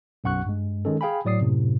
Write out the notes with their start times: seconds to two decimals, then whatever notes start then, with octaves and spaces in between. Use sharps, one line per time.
0.24 B1 F#2 F#5 C#6 F#6
0.46 G2 G#3
0.85 D#3 G#3 C#4 A4
1.01 G#4 F5 G5 G#5 B5
1.25 A2 F#3 D5 D#6 C7
1.41 F#2 A2 C3